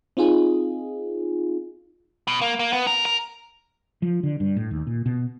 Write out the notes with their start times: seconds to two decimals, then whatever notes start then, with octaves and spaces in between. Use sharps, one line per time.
0.17 C4 D#4 F4 G#4
2.27 B2
2.41 A#3
2.59 A#3
2.73 B3
2.87 A#4
3.05 A#4
4.02 F3
4.23 D3
4.40 G2
4.56 A2
4.71 D#2
4.87 A#2
5.06 B2